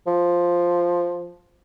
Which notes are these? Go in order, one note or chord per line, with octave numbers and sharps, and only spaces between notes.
F3